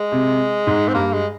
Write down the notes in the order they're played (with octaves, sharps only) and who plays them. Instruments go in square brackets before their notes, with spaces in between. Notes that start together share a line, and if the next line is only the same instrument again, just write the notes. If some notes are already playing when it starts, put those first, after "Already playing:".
Already playing: [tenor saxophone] G#3
[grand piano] C3
G#2
[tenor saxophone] C4
[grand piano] G2 [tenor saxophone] A#3
[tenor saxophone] G#3